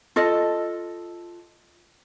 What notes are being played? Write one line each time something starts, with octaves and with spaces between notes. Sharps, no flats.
F4 A4 D#5